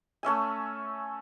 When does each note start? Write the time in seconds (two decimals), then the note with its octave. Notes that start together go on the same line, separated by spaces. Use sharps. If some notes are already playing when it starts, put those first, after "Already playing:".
0.23 A3 C#4 E5 G#5